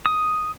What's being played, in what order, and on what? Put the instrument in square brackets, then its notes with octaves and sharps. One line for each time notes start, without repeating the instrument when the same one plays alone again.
[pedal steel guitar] D#6